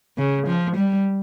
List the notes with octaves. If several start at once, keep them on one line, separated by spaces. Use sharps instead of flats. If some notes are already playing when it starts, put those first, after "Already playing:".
C#3
F3
G3